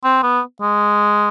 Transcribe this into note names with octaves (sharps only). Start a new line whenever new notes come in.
C4
B3
G#3